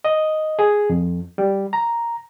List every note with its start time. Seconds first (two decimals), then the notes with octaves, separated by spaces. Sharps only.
0.04 D#5
0.59 G#4
0.90 F2
1.38 G3
1.73 A#5